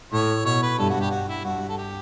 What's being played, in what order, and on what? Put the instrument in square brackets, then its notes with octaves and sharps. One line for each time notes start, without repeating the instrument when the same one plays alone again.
[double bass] A2 [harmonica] C#5
[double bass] B2 [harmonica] C#5
[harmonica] B4
[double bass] G2 [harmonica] A4
[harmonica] F#4
G4
F#4
E4
[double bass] G2 [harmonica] F#4
[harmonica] A4
G4